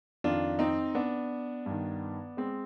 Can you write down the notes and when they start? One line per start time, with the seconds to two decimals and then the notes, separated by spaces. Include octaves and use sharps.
0.24 F2 D#3 D4 F4
0.59 C4 D#4
0.95 B3 D4
1.66 G2 D#3
2.37 G#3 C4